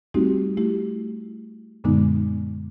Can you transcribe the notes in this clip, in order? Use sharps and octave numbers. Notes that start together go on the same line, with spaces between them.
G3 A3 C4 D#4 F#4 G4
A3 E4 G4
F#2 A#2 D3 G#3 B3 D#4